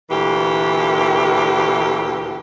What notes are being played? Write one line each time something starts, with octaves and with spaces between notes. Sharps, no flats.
D2 A#2 E3 G4